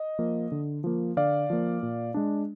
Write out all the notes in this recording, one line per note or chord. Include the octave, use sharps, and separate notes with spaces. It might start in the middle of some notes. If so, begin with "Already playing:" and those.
Already playing: D#5
F3 A#3
D3
F3 A#3
D3 D5 F5
F3 A#3
A#2
G#3 D4